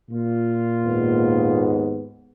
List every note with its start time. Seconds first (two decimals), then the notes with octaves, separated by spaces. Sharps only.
0.11 A#2 F4
0.83 D#2 G#2 B3